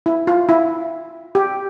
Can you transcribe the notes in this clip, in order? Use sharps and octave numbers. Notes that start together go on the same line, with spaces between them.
E4
F4
E4
G4